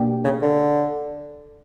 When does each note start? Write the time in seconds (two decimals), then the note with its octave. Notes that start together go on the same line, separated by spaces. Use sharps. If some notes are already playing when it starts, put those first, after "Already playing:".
Already playing: B2 A#3 D4 G4
0.24 C#3
0.42 D3